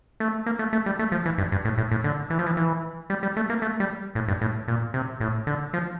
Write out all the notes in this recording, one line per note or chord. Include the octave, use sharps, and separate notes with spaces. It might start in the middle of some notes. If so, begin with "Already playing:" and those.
A3
A#3
A3
A3
G3
A3
F3
E3
G2
G2
A2
A2
A2
D3
E3
F3
E3
E3
G3
G3
A3
A#3
A3
G3
A2
G2
A2
A#2
C3
A2
D3
F3